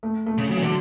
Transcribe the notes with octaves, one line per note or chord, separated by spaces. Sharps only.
A3
A3
C#3
C#3 F#3
E3
D3 F#3